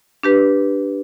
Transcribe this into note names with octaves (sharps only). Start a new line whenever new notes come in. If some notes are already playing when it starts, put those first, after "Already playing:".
D4 G4 B4